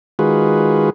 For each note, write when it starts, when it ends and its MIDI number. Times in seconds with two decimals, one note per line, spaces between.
0.19 0.90 51
0.19 0.90 56
0.19 0.90 65
0.19 0.90 66
0.19 0.90 68
0.19 0.90 71